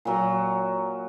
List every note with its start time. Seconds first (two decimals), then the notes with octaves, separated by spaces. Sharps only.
0.05 A#2 F#3 A#5